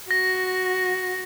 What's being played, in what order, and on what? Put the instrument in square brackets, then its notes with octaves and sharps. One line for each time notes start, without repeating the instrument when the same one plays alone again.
[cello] F#4 [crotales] A#6